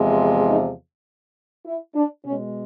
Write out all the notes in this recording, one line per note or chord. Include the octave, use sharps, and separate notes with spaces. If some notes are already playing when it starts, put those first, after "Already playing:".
Already playing: E2 C3 F3 G#3
D#4
E4
D4
B2 G#3 C#4